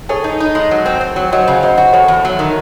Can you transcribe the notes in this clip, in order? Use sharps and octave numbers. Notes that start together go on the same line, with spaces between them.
G#4 A4 C#5
D#4
D#4
G#3
F#3
C4
C4
F#3
F#3 C5 D#5
C#3
F#3 C5 D#5
F#4
E2 A4 C#5
E2
F#3
D#3